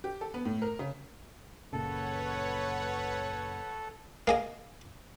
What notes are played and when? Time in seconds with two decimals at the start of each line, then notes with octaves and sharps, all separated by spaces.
0.04 G4
0.21 A4
0.34 B3
0.45 A2
0.62 A#4
0.79 C#3
1.73 F#1 A#2 C#3 A4 B4 C#5 F#5
4.27 A#3 G#4 D#5